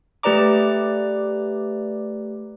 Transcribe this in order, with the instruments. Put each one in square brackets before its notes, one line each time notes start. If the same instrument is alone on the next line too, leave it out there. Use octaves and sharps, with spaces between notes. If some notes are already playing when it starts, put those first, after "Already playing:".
[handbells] A3 G4 B4 D5 A#5 D6